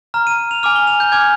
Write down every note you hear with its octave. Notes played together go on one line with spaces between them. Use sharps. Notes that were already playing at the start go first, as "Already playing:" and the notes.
A#5 F6
D#7
D#7
F7
G#5 D6 F6 F7
G7
F7
G6
G#5 D6 F6 G#6